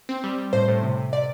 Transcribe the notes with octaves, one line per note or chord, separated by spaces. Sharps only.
C4
G3
G3
A2 C5
A2
C3
C3
C3 D5